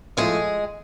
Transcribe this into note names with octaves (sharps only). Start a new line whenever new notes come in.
A2 F3 G#3 A3 G#4